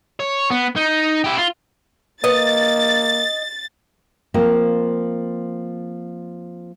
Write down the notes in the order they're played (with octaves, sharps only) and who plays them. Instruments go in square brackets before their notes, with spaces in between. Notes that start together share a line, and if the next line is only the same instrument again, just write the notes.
[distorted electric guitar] C#5
B3
D#4
E4 G4
F4
[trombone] A#3 [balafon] B4 [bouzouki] D#5 [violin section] A6
[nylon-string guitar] F3 A#3 C4